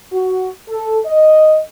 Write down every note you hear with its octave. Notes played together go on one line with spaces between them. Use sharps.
F#4
A4
D#5